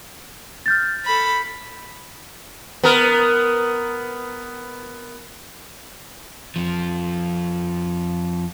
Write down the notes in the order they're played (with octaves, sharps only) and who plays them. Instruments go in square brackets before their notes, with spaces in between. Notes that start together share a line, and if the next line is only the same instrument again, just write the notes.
[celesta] F6 G6 A6
[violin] A4 B5
[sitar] B3 A#4
[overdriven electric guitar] F2 F3